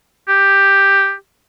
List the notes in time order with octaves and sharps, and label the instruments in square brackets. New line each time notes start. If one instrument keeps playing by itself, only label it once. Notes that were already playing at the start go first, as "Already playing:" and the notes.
[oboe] G4